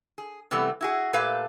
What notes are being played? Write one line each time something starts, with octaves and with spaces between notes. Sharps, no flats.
G#4
C3 E3 G3 A3 B3
E4 F#4 G#4
A#2 A3 G4 B4 F5